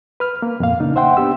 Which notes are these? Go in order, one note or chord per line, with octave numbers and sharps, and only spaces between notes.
B4 F6
A#3
F2 A#2 F5
C#3 A#3 D4 D#4
C5 E5 F#5 G5 C6
B3 D4 G4 E6